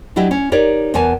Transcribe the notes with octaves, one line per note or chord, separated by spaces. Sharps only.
F#3 D4 E4 G4 D#5
C#4
D#4 G4 A#4 C#5 D5
E2 B2 B3 A#4 G#5 A5